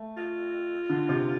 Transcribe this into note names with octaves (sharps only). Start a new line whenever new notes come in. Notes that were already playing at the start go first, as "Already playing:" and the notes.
Already playing: A3
F4
D3
C3